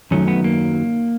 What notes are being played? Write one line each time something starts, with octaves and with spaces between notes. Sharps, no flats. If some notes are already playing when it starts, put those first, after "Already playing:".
F#2 D#3 F#3 A3 C#4
B3
A#3